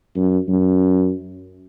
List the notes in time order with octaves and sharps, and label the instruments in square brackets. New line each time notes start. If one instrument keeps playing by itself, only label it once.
[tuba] F#2
F#2